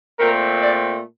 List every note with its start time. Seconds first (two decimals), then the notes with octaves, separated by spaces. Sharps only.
0.18 A#2 A3 C4 A#4
0.61 D5